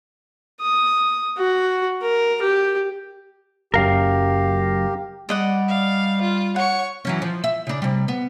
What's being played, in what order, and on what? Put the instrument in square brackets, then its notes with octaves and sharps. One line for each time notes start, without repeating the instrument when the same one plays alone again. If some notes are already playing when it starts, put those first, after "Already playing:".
[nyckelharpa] D#6
F#4
A#4
G4
[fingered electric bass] F#1 F#2 [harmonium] G4 [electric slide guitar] A#4 F5
[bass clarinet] G3 [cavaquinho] D5 D#5 F#5
[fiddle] F5
F4
[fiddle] C#5 C#6 [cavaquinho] F#5
[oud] E3 F#3 C#4
F3
E5
C#3 D4
C3 G3
B3